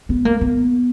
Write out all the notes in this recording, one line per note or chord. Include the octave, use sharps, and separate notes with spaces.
B3
A#3
B3